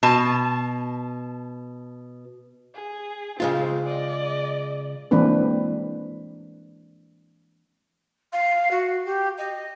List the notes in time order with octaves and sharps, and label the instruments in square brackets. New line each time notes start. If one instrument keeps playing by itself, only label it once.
[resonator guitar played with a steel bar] B2 A5
[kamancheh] G#4
[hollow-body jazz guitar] C#3 G#3 F4 [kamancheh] C4
[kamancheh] D5 D#5
[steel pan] E3 G#3 A#3 C4 D4 B4
[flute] F5
F#4
G4
D#5